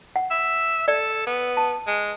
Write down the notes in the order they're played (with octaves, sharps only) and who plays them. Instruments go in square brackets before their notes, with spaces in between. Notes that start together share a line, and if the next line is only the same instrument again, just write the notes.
[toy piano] F#5
[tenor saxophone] E5
[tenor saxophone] A4 [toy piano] D5
[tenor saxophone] B3
[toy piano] A5
[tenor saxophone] G#3